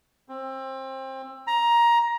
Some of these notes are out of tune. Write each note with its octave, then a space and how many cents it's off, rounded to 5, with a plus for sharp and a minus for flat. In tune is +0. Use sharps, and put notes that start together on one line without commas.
C4 +25
A#5 +15